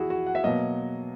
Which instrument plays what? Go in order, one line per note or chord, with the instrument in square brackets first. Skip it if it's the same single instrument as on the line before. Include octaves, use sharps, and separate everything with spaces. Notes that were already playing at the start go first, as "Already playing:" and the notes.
Already playing: [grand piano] E2 E4 F#4 G#4
F#4
F#5
E5
B2 F#3 A#3 D#5